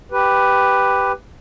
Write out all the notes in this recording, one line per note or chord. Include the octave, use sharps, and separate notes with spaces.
G4 B4